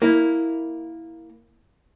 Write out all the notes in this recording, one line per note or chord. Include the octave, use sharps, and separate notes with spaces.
A#3 E4